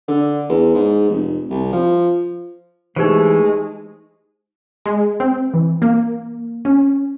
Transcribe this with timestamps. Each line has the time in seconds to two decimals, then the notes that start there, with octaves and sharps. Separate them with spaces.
0.08 D3
0.49 E2
0.74 G#2
1.09 F1
1.50 C2
1.73 F3
2.96 E3 G#3 A3 D#4 G4 C5
4.86 G#3
5.20 C4
5.54 E3
5.82 A#3
6.65 C#4